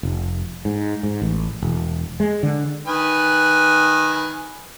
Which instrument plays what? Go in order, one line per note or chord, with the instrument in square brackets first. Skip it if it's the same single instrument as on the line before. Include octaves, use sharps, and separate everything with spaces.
[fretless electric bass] F1
G#2
G#2
A1
E1
G#3
D3
[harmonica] D#3 B4 G#5